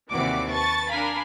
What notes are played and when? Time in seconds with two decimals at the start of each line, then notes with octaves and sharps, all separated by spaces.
0.11 D#2 C3 E3 F#4 D5 D6
0.50 B4 A5 C#6 A6
0.89 D4 A#4 F5 G#5 B5